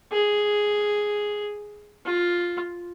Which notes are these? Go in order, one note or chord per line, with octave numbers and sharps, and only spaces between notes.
G#4
F4